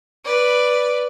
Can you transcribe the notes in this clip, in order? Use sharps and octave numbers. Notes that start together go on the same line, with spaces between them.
B4 D5